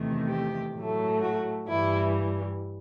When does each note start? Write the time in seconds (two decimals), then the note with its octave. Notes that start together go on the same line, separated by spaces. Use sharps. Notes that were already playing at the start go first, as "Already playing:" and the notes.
Already playing: E2 C3 D#3 A3
0.28 G4
0.75 A2 F#3 A3
1.20 F#4
1.67 G2 E3 G3 E4